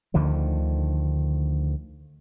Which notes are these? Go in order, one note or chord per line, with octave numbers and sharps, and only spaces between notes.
D2 D3 D#3 F3